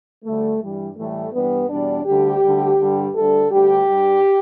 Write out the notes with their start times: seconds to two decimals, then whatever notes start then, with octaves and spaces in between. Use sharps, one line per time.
0.24 D2 D3 G3 A3
0.60 G2 E3 G3
0.97 A2 E3 G3 A3
1.33 G2 E3 G3 B3
1.69 E2 B2 G3 D4
2.06 D2 D3 G3 G4
2.42 D2 D3 G3
2.79 G2 D3 G3
3.15 D2 D3 G3 A4
3.51 D2 D3 G3 G4
3.88 G2 G3